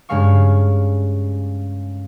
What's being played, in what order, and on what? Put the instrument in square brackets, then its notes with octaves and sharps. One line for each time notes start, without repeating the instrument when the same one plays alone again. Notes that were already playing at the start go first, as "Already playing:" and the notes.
[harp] G2 C#3 G#3 F5 C#6